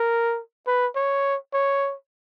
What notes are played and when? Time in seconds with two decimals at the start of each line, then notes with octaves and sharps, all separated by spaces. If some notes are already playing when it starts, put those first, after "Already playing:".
Already playing: A#4
0.67 B4
0.96 C#5
1.54 C#5